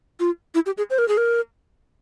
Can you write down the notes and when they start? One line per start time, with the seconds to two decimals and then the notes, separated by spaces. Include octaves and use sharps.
0.20 F4
0.55 E4
0.66 G4
0.78 G#4
0.90 C5
0.98 A#4
1.08 G#4
1.17 A#4